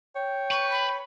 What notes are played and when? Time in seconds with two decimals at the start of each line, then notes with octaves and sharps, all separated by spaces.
0.16 C#5 G5
0.51 B4 C#6
0.71 B5